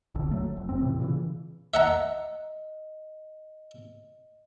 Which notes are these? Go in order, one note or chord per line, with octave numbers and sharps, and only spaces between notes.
G1 C2 D3
F#3 A3
F1
F#2 C4
A2 C3 E3
A#2 C#3 E3
D#5 E5 F#5 A#5